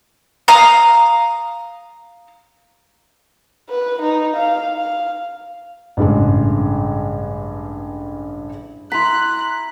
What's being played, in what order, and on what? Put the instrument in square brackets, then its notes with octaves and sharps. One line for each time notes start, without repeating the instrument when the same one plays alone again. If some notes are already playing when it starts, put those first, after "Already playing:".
[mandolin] F5 A#5 D#6
[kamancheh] B4
D#4
F5
F5
[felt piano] A1 G2 C#3 G#3
[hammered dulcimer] E4 A#5 [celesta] C6 B6 [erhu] F#6